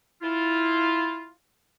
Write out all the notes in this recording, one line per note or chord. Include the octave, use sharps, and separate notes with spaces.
E4 F4